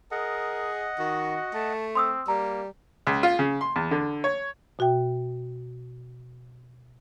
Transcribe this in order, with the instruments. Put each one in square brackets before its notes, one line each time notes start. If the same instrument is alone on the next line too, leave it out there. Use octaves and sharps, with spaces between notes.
[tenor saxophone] G#4 [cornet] A#4 [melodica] D#5 F#5
[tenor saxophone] D#3 [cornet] F#4
[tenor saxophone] A3 [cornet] A5
[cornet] C4 [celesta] C6 D#6 E6
[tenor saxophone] G3 [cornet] A#3 [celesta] A#5
[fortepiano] C#2
F4
C#3
C6
E2
D3
C#5
[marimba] B2 F#4 E5 G5